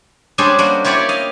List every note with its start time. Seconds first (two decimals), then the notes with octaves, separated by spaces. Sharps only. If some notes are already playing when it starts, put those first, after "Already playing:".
0.38 G3 G#3 C#4 D4 G#4 C5
0.59 G3 A#3 F#4
0.84 E4 F4 G4 C#5 D5
1.09 D#5 F5